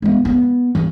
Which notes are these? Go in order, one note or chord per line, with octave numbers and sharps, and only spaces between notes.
G#3 B3
B3
E3